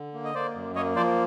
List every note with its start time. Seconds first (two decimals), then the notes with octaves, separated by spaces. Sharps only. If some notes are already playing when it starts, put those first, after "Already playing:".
Already playing: D3
0.14 A#3
0.25 D#5
0.35 A#3 C5 D5
0.55 F#2
0.75 A#3 C#5 D#5
0.96 F3 C5 D5